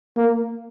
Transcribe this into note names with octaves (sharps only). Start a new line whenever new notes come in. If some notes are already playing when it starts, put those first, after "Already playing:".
A#3